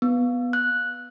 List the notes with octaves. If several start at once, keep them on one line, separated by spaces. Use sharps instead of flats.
B3
F#6